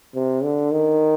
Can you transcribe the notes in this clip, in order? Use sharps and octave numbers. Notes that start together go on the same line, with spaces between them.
C3
D3
D#3